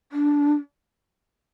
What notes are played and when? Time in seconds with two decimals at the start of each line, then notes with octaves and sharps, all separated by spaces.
0.12 D4